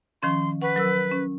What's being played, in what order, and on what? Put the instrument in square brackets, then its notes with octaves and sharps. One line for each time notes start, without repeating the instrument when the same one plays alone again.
[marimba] D#3 F3 C#4 [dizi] C6
[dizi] B4 [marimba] F#5 C#6
[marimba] F#3 A#4 E6
C#4